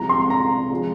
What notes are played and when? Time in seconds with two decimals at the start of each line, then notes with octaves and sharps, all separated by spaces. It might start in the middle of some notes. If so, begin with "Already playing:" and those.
Already playing: C2 C3 F3 G#3 A#5
0.09 C6
0.30 A#5
0.71 F3 G#3